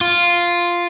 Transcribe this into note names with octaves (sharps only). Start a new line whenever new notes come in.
F4